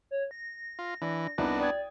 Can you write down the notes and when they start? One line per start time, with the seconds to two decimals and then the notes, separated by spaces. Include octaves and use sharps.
0.11 C#5
0.31 A#6
0.79 F4
1.02 E3 D4
1.38 C2 B3 D4 D#4
1.60 D5 G5 D#6 G#6